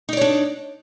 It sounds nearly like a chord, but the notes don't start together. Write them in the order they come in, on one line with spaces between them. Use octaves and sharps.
D#4 D5 C#5 D4